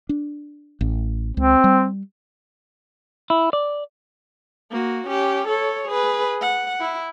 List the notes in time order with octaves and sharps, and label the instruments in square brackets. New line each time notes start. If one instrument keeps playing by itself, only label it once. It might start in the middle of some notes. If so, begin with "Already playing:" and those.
[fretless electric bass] D4
A1
[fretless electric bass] C#2 [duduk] C4
[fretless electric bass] G3
[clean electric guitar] E4
D5
[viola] A#3 F#4
C#4 G4
A4 C#5
G#4 B4
F#5
E4